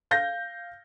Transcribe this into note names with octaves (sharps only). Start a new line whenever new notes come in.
F5 G6 A#6